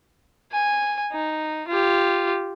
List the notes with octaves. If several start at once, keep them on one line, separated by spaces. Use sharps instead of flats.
G#5
D#4
F4 G4